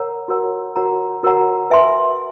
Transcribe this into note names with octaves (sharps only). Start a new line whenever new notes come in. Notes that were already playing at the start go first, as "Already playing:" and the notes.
Already playing: A#4 C#5 F#5 A#5
F#4 A#4 C#5 F#5 A#5
F#4 A#4 C#5 F#5 A#5
F#4 A#4 C#5 F#5 A#5
B4 E5 G#5 C6